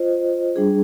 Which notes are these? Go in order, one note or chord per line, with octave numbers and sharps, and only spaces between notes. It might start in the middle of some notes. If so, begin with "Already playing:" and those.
Already playing: F4 C5 D#5
G3 D4 G#4